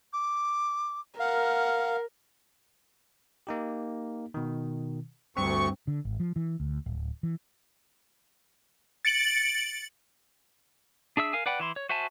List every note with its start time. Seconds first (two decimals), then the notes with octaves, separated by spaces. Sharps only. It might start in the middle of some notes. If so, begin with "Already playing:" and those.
0.13 D6
1.20 A#4 F5 F#5
3.47 A#3 D#4 G4
4.34 B2 D#3
5.37 D2 G2 C4 C#6
5.87 D3
6.05 G#1
6.20 F3
6.36 E3
6.60 D2
6.86 D1
7.23 E3
9.05 A6 C#7 D7 F#7
11.17 D4 G#4 E5 E6
11.33 A#4 F5 G#5
11.46 B4 D5 F#5 G5 B5
11.60 E3 E4 C6
11.76 C#5
11.89 F#4 C5 E5 G#5 A5